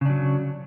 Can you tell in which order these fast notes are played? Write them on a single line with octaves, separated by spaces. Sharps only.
C#3 D4 F#3